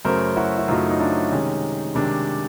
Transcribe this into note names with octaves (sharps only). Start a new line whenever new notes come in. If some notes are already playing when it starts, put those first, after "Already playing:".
F#2 C#3 F#3 A3 A#4 C5
E4 F#4
E4
F#2 C#3 F#3 A3 D#4 F4
D#4
D4 E4
C3 D#3 G#3 C#4 D#4
C3 D#3 G#3 D4